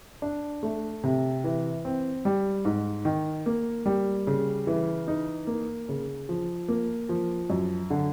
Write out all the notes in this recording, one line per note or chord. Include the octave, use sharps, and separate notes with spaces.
D4
A3
C3
E3
C4
G3
G#2
D#3
A#3
G3
C#3
E3
D#4
A#3
C#3
F3
A#3
F3
F#2
D3